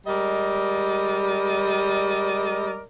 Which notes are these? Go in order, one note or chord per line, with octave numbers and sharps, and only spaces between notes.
G3 G#3 A#4 D5 D#5